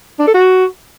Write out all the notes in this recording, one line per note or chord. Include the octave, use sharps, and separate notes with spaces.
D4
A4
F#4